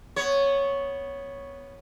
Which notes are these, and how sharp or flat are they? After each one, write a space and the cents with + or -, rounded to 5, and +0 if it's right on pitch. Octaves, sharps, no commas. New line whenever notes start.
B3 +0 C#5 +0